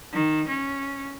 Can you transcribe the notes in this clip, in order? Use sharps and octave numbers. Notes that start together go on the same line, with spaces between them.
D#3
C#4